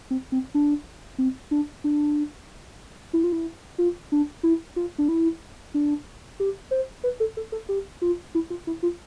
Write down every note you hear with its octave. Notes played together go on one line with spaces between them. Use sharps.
C4
C4
D4
C4
D4
D4
E4
F4
E4
F4
D4
E4
F4
D4
E4
D4
G4
C5
B4
A4
A4
A4
G4
F4
E4
F4
E4
F4